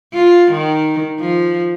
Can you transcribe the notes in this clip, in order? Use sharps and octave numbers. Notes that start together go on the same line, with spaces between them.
F4
D#3
F3